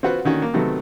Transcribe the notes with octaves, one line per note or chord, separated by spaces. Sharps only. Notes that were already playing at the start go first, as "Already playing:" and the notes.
C4 F4 F#4 B4 F#5
D3 D#3 C#4 F#4
A#3
C3 D#3 F#3 A3 B3